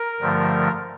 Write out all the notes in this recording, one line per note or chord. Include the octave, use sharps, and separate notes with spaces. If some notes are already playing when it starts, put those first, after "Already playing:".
Already playing: A#4
G2 D3 F3 A3